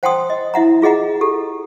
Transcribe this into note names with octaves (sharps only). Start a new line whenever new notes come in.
C5 F#5 G5 A5 C6 D#6
D#5
E4 E5 F#5 A#5
F4 G#4 D#5 F#5 A#5
G4 A4